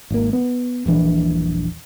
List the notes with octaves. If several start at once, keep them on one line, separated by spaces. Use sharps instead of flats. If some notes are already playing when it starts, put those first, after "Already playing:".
G#1 A#3
B3
D#1 A#1 E3 D4